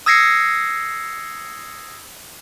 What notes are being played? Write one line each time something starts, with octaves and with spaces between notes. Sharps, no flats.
D#6 E6 G#6 A#6 C7 C#7